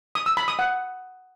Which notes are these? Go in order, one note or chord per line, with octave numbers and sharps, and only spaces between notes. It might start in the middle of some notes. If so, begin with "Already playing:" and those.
D#6
E6
B5
D#6
F#5